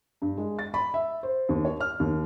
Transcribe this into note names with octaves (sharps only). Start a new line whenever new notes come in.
G2
G#3
A6
B5
E5
C5
D#2
C#5
F6
D#2